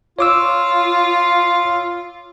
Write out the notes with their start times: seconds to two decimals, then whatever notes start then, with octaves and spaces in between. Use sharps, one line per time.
0.19 F4 C#5 D6 E6